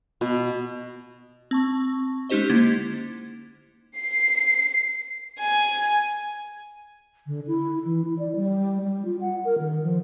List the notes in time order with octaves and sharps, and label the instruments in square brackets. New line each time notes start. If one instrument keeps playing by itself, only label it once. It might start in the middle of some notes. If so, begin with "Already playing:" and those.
[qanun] B2
[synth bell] C4 A5 C#6
G#3 C#4 D#4 G4 C5 D#5
D3 A#3 E4 G#6 A6 B6
[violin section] C7
[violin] G#5
[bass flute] D3
E4
E3
E4
D5
G3
G3
F4
F#5
A#4
D#3
F3